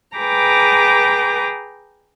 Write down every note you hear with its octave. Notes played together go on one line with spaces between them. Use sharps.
G#4 B4 G5 A#5 D6